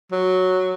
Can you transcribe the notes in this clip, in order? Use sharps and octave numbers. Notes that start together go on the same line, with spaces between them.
F#3